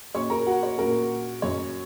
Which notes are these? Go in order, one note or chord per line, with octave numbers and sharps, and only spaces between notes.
A#2 F#3 C#4 C#5 C#6
A#4 A#5
F#4 F#5
C#5
A#2 F#3 C#4 A#4
F#2 F#3 C#4 C#5